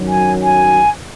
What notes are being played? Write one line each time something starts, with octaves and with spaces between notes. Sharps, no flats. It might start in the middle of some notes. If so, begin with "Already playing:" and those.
Already playing: F#2 D#3 F#3
G#5
G#5